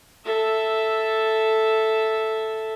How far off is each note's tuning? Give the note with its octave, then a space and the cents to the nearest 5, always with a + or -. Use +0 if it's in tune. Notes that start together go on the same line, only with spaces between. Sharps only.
A4 +0 E5 +0